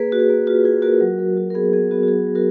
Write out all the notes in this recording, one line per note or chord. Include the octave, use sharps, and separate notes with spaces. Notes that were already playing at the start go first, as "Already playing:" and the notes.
Already playing: A#3 G#4 B4
A#3 F#4
G#4
A#3
F4 F#4
F4 G#4
A#3 F#4 A#4
F#3
F#3
F#4
A#4
B3 G#4
B3 G#4
B3 F#4
F#4
F#3 G#4
F#3
F#4 A#4